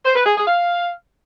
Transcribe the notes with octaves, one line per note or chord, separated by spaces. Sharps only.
C5
B4
G#4
G#4
F5